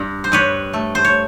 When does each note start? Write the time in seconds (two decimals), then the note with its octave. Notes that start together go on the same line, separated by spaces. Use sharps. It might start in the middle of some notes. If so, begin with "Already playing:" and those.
Already playing: G2
0.24 C5
0.32 G2 B4 C#5
0.73 A3
0.95 C5
1.04 C#5